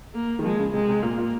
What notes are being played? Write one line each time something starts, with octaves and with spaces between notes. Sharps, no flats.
A#3
D#3
F3 G#3
C#3
C3 G#3
C3
A#2 A#3
A#2